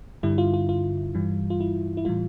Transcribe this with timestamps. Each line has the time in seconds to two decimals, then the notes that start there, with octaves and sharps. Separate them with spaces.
0.23 G2 D3 G3 E4
0.38 F4
0.54 F4
0.69 F4
1.15 G2 E3 G3
1.50 F4
1.61 E4
1.97 E4
2.05 A2 E3 G3 F4